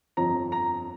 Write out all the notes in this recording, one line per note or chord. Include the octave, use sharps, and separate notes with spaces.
G1 F2 F3 C4 A#5
A#5